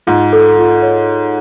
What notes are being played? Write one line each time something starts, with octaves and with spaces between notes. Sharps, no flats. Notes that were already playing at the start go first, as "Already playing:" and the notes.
G#2 F4
A4
F4
C#5